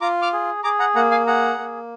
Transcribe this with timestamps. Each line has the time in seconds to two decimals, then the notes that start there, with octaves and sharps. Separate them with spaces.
0.01 F4 A#5 D6
0.22 D6 F6
0.33 G#4
0.64 G#4 A#5 D6
0.80 F#5 A#5
0.95 A#3 F#5 A#5
1.11 F5 G#5
1.27 G#4 F#5 A#5
1.58 A#3